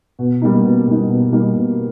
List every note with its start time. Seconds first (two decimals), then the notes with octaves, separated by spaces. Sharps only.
0.19 B2
0.42 G3 A#3 D#4
0.65 B2
0.87 G3 A#3 D#4
1.09 B2
1.32 G3 A#3 D#4
1.55 B2